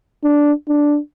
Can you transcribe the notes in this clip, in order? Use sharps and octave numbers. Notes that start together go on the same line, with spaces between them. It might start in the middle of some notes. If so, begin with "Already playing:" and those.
D4
D4